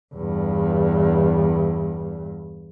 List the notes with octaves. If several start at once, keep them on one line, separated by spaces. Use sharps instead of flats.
E2 G2